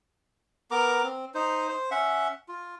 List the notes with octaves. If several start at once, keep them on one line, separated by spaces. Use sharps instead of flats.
B3 A#4 A#5 D6
C4
D#4 C5
C5
C#4 E5 F#5
F4